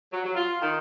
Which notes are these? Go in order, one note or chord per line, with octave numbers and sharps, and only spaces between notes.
F#3
F#3
F4
D#3